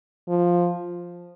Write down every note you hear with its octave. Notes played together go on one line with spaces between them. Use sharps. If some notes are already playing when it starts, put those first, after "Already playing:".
F3